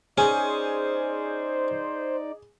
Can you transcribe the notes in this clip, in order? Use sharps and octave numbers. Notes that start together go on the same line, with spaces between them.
C#4 D#4 G#4 C5 D5